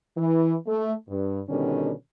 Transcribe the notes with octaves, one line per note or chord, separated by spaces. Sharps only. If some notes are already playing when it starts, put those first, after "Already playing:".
E3
A3
G2
B2 D3 D#3 G3 C#4